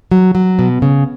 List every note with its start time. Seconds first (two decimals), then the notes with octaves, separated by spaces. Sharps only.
0.11 F#3
0.35 F#3
0.59 B2
0.82 C#3